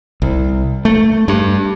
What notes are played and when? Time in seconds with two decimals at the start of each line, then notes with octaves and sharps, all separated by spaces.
0.22 C2
0.85 A3
1.28 G2